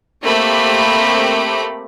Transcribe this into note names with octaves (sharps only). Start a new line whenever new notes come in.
A3 A#3 C4 G4 B5 D6